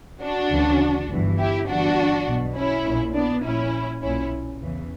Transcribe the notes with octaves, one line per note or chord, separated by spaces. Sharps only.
D4 F#4
D2 C#3 E3
G1 G2 E3
E4 G4
G1 G2 E3 D4 F#4
B1 B2
C#4 E4
A#1 A#2
B3 D4
A#1 A#2 C#4 E4
B1 A#2 C#4 E4
E2 C#3 E3